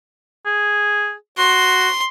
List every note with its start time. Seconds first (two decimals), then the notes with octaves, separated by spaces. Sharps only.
0.46 G#4
1.38 F#4 C6